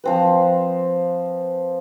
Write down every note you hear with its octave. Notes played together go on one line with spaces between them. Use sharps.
F3 C4 B4